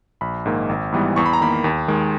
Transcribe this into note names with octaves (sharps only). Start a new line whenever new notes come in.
A#1 B5
G#2 D#3 A#3
G#1
G#2 E3 G3 B3
E2 C#6
B5
A#5
D#3 A#3 B5
D#2
D#3 G#3